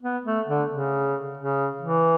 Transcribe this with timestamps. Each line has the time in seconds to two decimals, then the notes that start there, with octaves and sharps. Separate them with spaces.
0.02 B3
0.25 A3
0.48 D3
0.70 C#3
1.37 C#3
1.81 E3